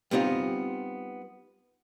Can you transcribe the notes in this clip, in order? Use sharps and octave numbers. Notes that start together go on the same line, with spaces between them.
G3 B3 C4 D#4 F4